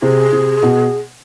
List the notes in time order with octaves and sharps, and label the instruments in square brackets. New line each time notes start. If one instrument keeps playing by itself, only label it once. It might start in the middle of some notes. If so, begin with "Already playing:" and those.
[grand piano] C3 [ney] G#4
[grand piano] C3
B2